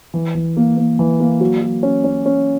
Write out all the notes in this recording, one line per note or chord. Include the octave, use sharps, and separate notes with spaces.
E3
E3
A#3
A#3
E3
A#3
F#3
F#3
C#4
C#4
C#4